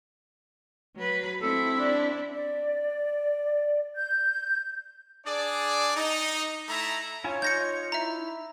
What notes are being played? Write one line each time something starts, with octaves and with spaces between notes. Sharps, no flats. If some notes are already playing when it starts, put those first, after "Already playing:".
F#3 B4
C4 E4 A4
D4
D5
G6
D4 G#4 D5
D#4
A3 E4 A#5
E4 F4 C#5 G#5
D#4 F4 G6 A#6 C#7
E4 E5 A#5